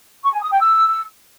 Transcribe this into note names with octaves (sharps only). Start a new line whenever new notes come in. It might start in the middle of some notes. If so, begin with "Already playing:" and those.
C#6
G#5
D#6
G5
E6